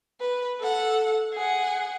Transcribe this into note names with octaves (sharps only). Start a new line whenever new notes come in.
B4
A4 F#5
G#4 F#5